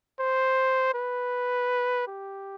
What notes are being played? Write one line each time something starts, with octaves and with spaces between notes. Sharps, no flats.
C5
B4
G4